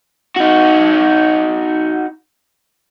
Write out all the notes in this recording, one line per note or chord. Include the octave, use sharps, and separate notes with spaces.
D#4 F#4